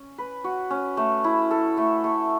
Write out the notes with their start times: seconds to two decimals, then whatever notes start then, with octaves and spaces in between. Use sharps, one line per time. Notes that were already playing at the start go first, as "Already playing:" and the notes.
Already playing: C#4
0.18 B4
0.44 F#4
0.70 C#4
0.97 A3
1.24 E4
1.51 A4
1.77 A3
2.04 A3